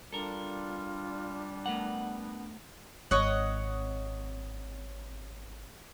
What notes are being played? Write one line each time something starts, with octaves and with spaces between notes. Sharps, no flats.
G3 D4 F4 A4 A#4
A3 B3 A#4 F#5
G#1 C4 C#5 D#5 F#5